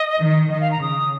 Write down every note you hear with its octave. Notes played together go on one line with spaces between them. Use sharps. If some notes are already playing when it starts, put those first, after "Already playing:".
Already playing: D#5
D#3
D#3 D#5
F5
A#5
C#3 D#6